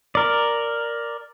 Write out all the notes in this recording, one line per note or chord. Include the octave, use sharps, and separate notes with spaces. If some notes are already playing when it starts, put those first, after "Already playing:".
A#4 D5